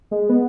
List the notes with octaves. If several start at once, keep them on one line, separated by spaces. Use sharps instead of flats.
G#3
B3